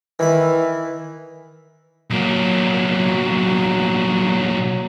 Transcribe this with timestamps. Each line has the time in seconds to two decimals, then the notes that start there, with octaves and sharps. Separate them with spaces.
0.19 D#3 E3 E4 B5
2.10 B1 F#3 A#3